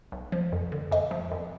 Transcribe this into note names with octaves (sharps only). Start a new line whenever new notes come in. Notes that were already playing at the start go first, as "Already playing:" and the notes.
B1
F3
F2
D3
F2 D#5
F3
F2